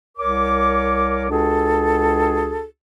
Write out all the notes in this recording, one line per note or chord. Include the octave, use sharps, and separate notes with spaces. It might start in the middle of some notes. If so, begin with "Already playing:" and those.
C2 A#4 C#5 D6
C#2 D4 F#4 G#4 A4